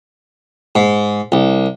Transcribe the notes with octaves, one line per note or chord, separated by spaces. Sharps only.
G#2
C2